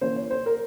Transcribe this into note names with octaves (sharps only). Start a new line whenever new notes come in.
E3 A#3 C#4 C5
C#5
C5
A#4